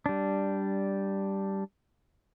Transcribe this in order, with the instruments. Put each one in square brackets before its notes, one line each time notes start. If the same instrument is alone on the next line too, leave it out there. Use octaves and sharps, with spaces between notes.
[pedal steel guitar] G3 D4